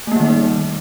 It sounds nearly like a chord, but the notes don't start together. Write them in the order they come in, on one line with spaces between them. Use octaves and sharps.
A3 A#3 G3 D#3 D#4